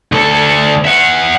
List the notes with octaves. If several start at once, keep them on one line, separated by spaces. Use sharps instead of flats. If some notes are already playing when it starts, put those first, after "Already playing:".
D2 A4
E5 F#5